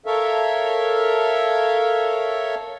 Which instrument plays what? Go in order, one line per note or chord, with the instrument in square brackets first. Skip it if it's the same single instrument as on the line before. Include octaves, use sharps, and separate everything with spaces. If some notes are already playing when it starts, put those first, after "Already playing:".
[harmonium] A4 A#4 C#5 E5 F5